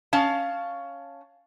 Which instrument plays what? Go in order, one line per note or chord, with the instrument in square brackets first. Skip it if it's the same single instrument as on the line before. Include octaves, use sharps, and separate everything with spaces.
[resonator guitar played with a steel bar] C#4 F5 A5